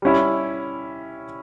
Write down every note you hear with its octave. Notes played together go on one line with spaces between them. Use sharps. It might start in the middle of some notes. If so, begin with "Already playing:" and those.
G3 C#4 E4